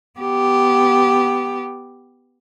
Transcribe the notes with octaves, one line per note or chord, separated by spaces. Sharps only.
B3 G4